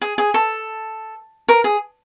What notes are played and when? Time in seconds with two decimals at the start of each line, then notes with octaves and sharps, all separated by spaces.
0.01 G#4
0.18 G#4
0.34 A4
1.49 A#4
1.64 G#4